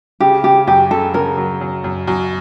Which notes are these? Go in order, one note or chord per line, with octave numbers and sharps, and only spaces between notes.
C#3 G4
C#3 G4
F#2 G4
C#3 A4
C#3 A#4
F#3
F#2
F#2
F#2